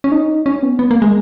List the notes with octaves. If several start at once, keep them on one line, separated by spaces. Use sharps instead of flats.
C#4
D#4
C#4
B3
B3
A#3
G#3